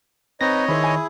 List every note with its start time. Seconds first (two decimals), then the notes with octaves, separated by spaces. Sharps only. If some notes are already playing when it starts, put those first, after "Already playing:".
0.41 C4 D#4 B4 C#5 D#5 A#6
0.69 D#3 E4 G#4 C5 B5
0.84 G#5